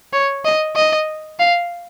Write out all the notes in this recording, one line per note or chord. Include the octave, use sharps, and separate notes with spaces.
C#5
D#5
D#5
F5